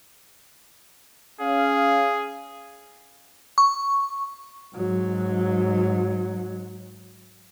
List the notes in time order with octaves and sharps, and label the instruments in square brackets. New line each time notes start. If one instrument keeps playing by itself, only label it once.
[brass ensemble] C#4 F5 [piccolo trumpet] G#4
[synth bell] C#6
[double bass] G#2 F#3